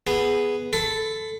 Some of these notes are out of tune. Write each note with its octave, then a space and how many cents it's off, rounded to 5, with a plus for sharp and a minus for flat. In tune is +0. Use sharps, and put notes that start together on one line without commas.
B3 +0 G#4 +0
A4 +0 B5 +35